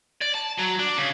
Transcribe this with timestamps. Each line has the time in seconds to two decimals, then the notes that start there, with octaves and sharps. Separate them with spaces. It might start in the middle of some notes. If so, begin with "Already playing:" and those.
0.22 D5
0.35 A5
0.59 F#3
0.80 D4
0.98 C#3